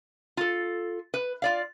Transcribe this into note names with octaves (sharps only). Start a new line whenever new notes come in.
F4 A4
B4
F4 D5 F5